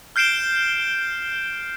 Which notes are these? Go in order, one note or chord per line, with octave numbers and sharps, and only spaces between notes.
F6 G6 C7 D7 E7 G7